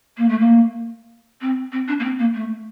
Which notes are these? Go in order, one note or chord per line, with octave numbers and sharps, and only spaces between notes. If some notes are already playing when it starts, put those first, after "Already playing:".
A#3
A3
A#3
C4
C4
D4
A#3
C4
A#3
A3